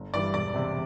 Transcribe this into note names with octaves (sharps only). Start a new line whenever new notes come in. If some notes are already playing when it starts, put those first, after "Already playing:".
Already playing: G1
G2 E3 G3 D5
E1 D5
E2 C3